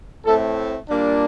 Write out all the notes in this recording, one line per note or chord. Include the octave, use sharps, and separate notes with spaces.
A2 A3 C4 A4
A#2 G3 A#3 D4